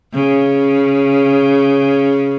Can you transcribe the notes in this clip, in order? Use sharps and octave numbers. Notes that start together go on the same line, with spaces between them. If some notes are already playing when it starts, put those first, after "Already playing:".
C#3